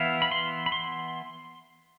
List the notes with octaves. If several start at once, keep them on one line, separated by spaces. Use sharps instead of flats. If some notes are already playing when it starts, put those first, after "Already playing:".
Already playing: E3 B3 E4 F5
B5
C6
B5
C6